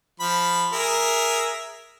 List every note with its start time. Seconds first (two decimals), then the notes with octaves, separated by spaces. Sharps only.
0.20 F3 B5
0.73 G#4 A#4 E5